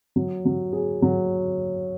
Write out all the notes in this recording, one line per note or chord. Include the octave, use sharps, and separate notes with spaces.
F#3
F#3
G#4
F#3